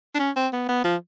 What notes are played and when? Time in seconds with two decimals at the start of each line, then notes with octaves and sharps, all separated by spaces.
0.15 D4
0.19 C#4
0.36 C4
0.53 B3
0.69 B3
0.84 F3